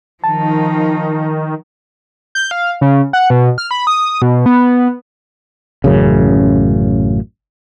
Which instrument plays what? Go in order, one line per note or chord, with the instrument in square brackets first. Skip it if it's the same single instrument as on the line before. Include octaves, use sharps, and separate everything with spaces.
[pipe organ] D#3 [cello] F3 D#4 [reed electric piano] A5
[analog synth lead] G6
F5
C#3
F#5
B2
F6
B5
D#6
B2
B3
[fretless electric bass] A1 F#2 C#3